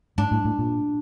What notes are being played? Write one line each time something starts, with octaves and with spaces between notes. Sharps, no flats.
G#2 D4
A2
A2
A#2